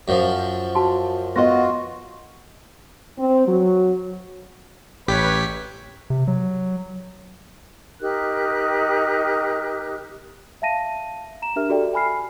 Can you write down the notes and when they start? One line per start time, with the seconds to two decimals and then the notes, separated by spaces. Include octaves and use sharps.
0.08 F#2 F3
0.75 F#4 A5 C6
1.36 B3 F4 F#4 D#5 F#5 C#6 A#6
3.17 C4
3.46 F#3
5.08 A1 G4 B4 C#5 B6
6.10 C3
6.27 F#3
8.01 D#4 G4 A#4 F#6
10.62 E5 F5 A5 A#6 D#7
11.42 A#5 E7
11.56 D4 G4 A#4 E5 F6
11.69 F#4 G4 A4 D5 E5 G5
11.93 G5 G#5 B5 F6 C7